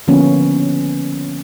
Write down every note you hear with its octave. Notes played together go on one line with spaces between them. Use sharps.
D3 F3 A#3 B3 C#4